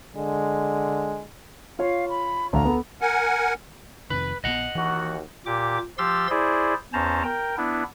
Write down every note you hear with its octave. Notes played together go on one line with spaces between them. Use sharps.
D3 G#3
F4 C#5 F5
B5
D2 F5 A#5
B3 A4
A#4 F#5 G#5
F2 C3 D#3 B4
A#1 D#3 B3 D#5 F#5
D#2 E3 F#4
A#2 G4 D6
F3 G4 F5 C6 E6 A6
E4 G#4 C5 D5
E2 C#4 C5 A5 A#5
A#4 G5
B3 D4 E4